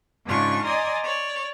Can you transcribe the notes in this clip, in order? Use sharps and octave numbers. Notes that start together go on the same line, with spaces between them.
G#2 C#3 D4 F4 C#6
D5 D#5 G#5 A#5 C6 D#6
C#5 D5